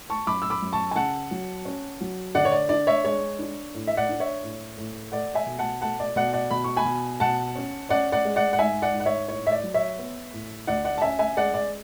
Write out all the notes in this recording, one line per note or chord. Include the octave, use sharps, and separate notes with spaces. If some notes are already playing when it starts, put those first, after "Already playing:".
A5 C#6
F#2 B5 D6
E6
B5 D6
F#2
A5 C#6
G#5
C#3 F#5 A5
F#3
C#4
F#3
D3 D5 F#5
C#5
D5
D4 D5
C#5 E5
G#3 C#5
D4
A2
E5
D5 F#5
D4
C#5 E5
A2
A2
A3 D5 F#5
E5 G#5
B2
F#5 A5
A3 F#5 A5
D5
B2 D5 F#5
D5 F#5
B2 B5
C#6
G#5 B5
B2
B2 F#5 A5
C#4
C#4 D5 F#5
D5 F#5
G#3
D5 F#5
F#5
G#2 E5 G#5
D5 F#5
G#2
F#5
C#5 E5
A2 C#5
E5
D5
F#3
C#5 E5
B3
A2
D2 D5 F#5
D5 F#5
A5
C#4 E5 G#5
E5 G#5
G#3 D5 F#5
D5